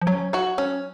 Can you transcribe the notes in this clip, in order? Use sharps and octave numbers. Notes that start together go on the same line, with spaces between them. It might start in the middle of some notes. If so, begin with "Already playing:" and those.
F3
F#3 C#4
F#4 C#5
C#4